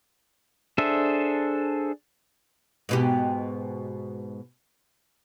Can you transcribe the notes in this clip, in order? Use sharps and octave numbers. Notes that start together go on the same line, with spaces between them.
D4 G#4 A4 C5 E5
G#2 B2 G4